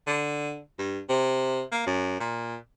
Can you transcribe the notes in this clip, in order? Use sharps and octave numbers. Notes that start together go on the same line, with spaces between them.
D3
G2
C3
A#3
F#2
A#2